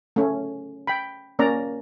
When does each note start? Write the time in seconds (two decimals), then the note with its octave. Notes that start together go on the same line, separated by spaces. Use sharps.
0.16 A3 C#4
0.87 G5 B5
1.39 A#3 C#4 D5 A#5